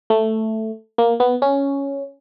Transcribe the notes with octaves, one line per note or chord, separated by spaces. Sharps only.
A3
A#3
B3
C#4